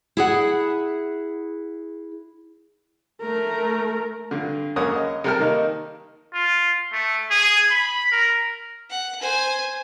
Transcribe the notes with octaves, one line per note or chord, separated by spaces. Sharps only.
E4 G#4 F#5
A3 A#4
G2 D3
F#2 C#3 A#3 C#5 F#5 D#6
D#5
C3 G3 A#4 G5 A5 F6
D#3 A#3 D#4
F4
A3
G#4
B5
A#4
F#5
C5 G#5